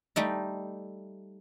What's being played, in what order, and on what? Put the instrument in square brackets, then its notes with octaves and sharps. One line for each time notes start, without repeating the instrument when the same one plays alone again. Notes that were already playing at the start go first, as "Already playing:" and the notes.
[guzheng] G3 A3 D#4